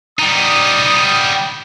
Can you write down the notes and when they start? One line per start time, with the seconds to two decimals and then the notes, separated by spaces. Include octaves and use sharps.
0.19 G3 D#4 D#6